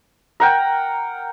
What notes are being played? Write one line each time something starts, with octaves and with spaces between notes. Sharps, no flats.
A#4 F#5 G5